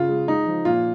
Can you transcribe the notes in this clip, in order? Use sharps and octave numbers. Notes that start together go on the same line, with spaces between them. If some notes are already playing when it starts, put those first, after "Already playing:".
Already playing: C#3 F4
G#3
G#3 D#4
F3
A#2 F4